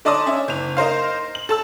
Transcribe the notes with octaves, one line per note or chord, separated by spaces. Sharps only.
D3 D#4 D5 A5 C6 D#6
C#4 E5
F#1 F7
D#4 A#4 C5 F5
F#7
A4 A5 E6